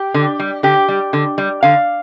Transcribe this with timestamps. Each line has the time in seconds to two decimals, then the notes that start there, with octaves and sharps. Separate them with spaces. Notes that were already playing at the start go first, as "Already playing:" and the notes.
Already playing: G4
0.14 D3
0.40 G3
0.63 D3 G4
0.88 G3
1.13 D3
1.38 G3
1.63 D3 F5